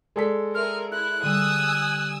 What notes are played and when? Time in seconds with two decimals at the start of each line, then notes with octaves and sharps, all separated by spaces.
0.16 G#3 A4 D5 B6
0.55 G#4 A#4 E5 C6 F6
0.92 E4 F#6
1.22 D3 G3 G#5 D#6 E6